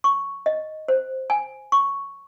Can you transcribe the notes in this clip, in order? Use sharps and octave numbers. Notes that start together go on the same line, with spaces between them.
C#6
D#5
C5
G#5
C#6